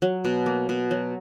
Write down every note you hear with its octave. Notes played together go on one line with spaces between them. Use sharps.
F#3
B2
A#3
B2
F#3